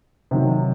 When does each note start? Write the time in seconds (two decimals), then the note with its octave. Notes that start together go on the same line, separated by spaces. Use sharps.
0.31 C3 D#3 F#3